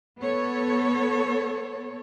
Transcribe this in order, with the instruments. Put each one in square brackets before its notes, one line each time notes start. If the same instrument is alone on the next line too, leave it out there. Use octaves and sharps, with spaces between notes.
[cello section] B3 A4 C#5